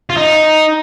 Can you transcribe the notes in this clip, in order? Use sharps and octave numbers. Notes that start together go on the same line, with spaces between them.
F4
D#4